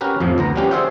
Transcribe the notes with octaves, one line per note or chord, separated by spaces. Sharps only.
C#4 F#4 G4 A#4 B4
F2 A2 F3
D2 B3 A#5
F3 G3 B3 C#4 F#4 G4
G#4 C5 D5 E5 F#5 G5